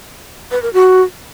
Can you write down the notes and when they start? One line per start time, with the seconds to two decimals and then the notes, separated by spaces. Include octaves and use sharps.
0.51 B4
0.63 A#4
0.74 F#4